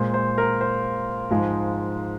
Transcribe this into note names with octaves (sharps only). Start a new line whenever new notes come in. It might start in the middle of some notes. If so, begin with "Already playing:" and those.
Already playing: A#2 G#3 C5
C5
A#4
C5
G#2 F3 G#3